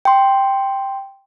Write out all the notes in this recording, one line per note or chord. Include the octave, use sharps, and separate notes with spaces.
G5 C6